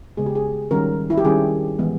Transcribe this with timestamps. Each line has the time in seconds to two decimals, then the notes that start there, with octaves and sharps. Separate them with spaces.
0.17 C#3 G#3 B3 G#4
0.26 G4
0.35 G#4
0.71 D#3 G3 C#4 A#4
1.10 E4
1.17 G4
1.25 D#3 G3 C#4 G#4
1.79 E3 G#3 B3